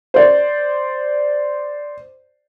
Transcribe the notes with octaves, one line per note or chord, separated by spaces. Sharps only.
C5 D5